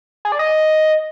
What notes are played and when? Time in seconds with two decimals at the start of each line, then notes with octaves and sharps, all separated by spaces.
0.25 G#4
0.32 D5
0.39 D#5